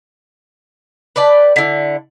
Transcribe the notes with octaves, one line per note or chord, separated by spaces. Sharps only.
B4 D5 G5 A5
D3 E4